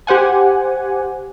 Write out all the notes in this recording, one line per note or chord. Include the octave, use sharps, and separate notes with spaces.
G4 C5 F#5 G#5